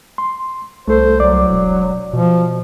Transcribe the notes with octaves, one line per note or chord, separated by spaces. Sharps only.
C6
C2 A3 A4 C5
C2 F#3 D5 D6
E1
B2 F3